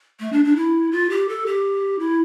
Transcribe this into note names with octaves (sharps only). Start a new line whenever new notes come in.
A3
D4
D4
E4
F4
G4
A4
G4
E4